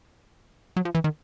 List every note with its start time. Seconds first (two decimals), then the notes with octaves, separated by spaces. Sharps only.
0.77 F#3
0.85 F3
0.95 E3
1.04 D#3